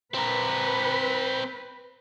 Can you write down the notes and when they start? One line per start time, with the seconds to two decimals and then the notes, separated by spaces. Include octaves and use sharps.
0.14 C4 A#4 B4